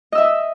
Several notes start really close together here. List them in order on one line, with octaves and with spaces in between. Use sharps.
D#5 E6 E5